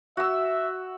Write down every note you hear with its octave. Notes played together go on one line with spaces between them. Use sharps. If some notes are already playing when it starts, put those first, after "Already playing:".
F#4 E5 E6